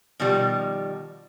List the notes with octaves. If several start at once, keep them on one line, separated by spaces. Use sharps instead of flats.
B2 D#3 F3 G3